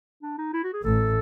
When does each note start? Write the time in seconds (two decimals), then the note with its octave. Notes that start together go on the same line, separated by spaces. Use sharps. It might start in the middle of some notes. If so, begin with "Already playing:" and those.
0.22 D4
0.38 D#4
0.53 E4
0.63 F#4
0.73 G#4
0.84 A1 A2 A4